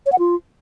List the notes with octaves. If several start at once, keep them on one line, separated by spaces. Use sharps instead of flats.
C#5
F#5
F4